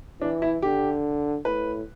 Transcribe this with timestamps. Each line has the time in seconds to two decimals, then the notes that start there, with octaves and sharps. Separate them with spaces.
0.21 E3 D4
0.42 E4
0.62 D3 G4
1.45 A2 B4